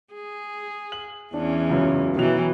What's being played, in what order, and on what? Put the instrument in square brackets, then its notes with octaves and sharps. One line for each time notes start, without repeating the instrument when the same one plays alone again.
[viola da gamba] G#4
[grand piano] F#7
[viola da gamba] E2 E3 C#4 [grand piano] D4
[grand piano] C#2 F#2
[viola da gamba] B2 E3 [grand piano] D#3 F#3 F7